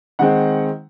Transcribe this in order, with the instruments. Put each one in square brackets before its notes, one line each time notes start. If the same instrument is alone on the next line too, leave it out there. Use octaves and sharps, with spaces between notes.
[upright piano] D#3 G#3 C4 F#5